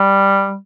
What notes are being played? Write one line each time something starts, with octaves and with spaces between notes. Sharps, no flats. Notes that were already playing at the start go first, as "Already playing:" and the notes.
Already playing: G3